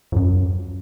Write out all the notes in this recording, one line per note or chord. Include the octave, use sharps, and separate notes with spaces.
F2
F#2